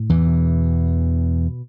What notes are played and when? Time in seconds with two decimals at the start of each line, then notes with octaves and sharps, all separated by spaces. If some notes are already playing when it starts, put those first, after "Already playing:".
Already playing: A2
0.10 E2 E3
0.27 B2